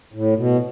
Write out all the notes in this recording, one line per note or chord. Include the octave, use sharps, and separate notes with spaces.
A2
B2